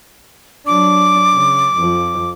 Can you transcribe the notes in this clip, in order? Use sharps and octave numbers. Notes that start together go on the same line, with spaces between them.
F#3 D4 D6
C#3
F2 F3